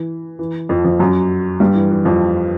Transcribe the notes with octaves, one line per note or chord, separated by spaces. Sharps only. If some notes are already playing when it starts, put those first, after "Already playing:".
Already playing: E3
E3
F2 F3
F2 F3
F#2 F#3
G2 G3
E3
E3
F2 F3